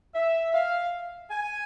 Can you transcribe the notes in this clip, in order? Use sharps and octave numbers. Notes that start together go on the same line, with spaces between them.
E5
F5
G#5